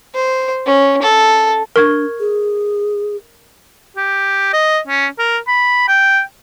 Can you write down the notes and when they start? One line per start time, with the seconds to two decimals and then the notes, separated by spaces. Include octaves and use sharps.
0.15 C5
0.66 C#4
1.02 A4
1.76 D4 A#4 C#6 G#6
2.20 G#4
3.97 G4
4.53 D#5
4.88 C#4
5.19 A#4
5.48 B5
5.88 G5